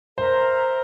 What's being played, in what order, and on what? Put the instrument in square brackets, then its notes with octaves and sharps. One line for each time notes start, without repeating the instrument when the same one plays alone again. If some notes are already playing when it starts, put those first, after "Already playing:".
[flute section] A#4 E5 A#5 [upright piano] C5